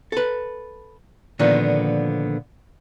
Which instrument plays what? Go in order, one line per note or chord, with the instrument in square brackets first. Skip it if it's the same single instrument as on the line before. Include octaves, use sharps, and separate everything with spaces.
[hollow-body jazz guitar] A4 B4
A#2 D3 D#3 F3 A#3 B3